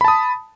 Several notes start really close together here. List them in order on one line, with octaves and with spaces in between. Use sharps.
B5 A5 D#6